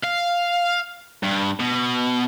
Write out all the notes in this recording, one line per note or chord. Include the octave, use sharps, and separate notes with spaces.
F5
G2
B2